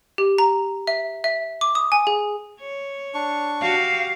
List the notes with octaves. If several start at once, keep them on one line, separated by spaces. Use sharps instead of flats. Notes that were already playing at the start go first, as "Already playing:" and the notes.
G4
A#5
E5
E5
D6
D#6
G#5
G#4
C#5
D4 C#6
F#4 G4 F5